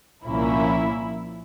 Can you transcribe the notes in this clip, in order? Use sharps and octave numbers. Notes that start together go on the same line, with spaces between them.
C2 A#2 F3 A#3 C#4 E4